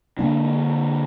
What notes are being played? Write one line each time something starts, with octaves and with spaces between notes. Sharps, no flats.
D3 E3 A#3 D4